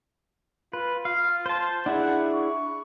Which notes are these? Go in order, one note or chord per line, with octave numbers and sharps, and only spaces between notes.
F4 B4
F4 F5
C5 A5
D4 E4 G#4 F#5
C#6